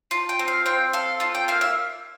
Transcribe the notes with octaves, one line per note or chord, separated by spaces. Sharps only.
F4 A5
G5
C4
F5
C4 G5
A4 F5
F4 A5
G5
A#3 F5
E5